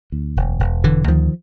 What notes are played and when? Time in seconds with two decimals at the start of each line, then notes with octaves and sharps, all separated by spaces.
0.12 D2
0.36 E1
0.59 E1
0.84 E1 D3 E3
1.08 D2 D#3 F3